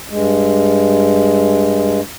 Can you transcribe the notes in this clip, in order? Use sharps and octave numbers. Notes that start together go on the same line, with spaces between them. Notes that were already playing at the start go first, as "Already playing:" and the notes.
G2 G#3